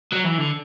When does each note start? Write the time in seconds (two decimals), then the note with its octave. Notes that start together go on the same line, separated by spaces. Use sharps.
0.13 F#3
0.25 E3
0.38 D3